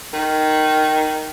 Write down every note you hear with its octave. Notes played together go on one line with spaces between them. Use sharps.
D#3